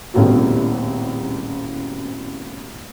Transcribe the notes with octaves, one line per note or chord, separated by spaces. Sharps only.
D#1 C2 A2 C#3 B3 F#4